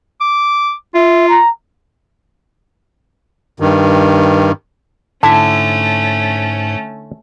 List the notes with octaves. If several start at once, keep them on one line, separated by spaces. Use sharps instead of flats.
D6
F4 E5
A#5
G2 D#3
G#2 D3 A3 C#4 E4 E5 A5